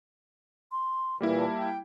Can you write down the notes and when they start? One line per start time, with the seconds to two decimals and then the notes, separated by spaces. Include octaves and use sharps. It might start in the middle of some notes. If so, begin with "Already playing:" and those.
0.72 C6
1.21 A#2 E3 G3 A#3 E4
1.38 A5
1.59 G5